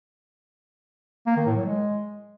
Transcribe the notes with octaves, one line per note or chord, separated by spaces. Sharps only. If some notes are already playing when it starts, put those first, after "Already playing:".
A#3
D#3
A2
F#3
G#3